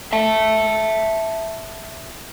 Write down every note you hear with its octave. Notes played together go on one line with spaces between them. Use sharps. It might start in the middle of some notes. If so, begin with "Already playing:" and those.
E5 A5